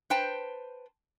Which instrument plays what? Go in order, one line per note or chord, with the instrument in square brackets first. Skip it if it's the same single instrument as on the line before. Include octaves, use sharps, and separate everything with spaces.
[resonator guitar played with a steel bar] B4 C5 G5 A5